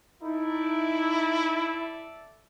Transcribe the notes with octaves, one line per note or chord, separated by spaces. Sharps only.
D#4 E4 A4 D5 E5